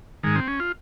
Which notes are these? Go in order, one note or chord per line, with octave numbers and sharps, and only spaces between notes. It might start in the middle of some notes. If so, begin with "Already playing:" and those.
G#2 D#3 G#3
C4
C#4
F4